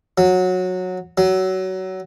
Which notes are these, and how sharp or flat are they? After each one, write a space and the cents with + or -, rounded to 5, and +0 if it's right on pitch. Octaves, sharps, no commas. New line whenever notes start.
F#3 -15
F#3 +20